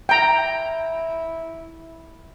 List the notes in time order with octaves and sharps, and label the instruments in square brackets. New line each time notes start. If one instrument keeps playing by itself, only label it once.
[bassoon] E4 [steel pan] G5 A#5